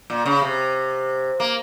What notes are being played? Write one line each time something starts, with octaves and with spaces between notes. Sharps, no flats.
A#2
C#3
C3
A#3